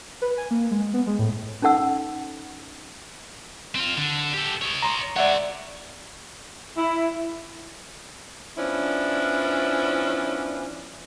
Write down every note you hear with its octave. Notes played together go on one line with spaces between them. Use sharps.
B4
G#5
A#3
G#3
B3
G#3
A2
C#4 D#4 A4 F#5 E6
C4 F4
D3
G4 A4
C#5 D#5
A#5 C6
G#3 C#5 D5 E5 F#5
E4
F3 B3 C#4 D4 E4